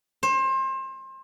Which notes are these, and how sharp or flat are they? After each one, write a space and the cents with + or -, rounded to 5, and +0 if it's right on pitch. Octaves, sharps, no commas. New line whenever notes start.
C5 +30